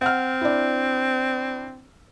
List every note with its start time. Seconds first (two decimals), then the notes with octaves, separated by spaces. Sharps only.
0.02 C4 F#5 F6
0.41 D4 E4